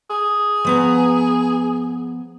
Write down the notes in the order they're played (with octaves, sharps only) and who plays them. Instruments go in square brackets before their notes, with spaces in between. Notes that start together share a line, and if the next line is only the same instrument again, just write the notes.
[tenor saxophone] G#4
[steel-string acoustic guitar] F3 B3 A#5